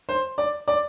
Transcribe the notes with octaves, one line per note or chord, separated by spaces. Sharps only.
C5
D5
D5